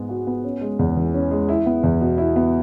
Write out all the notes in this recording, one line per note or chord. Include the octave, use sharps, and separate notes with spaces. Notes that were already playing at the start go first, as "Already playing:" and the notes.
Already playing: G#2 G#3 B3
F#4
B3
C#4
G#3
E2
E3
C#4
G#3
E4
B3
E2
B2
E4
B3